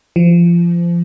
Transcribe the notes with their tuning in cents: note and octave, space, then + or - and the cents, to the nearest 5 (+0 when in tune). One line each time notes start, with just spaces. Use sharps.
F3 -25